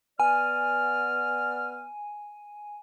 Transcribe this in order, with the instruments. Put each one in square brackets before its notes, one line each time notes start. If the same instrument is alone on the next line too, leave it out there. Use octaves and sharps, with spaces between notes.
[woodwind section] B3 D5 F6 [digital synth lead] G#5